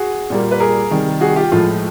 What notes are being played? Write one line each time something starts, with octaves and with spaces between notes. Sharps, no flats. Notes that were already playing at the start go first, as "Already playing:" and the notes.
Already playing: F#4 G#4
A#2 G3 A#3
B4
G#4 A#4
C3 D#3 G3
F#4 G#4
F4 G4
A2 F3 G#3 F4